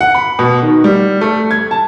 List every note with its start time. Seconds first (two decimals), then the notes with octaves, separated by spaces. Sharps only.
0.01 F#5
0.15 B5
0.39 B2
0.62 D#3
0.84 G3
1.21 A3
1.51 G#6
1.71 A5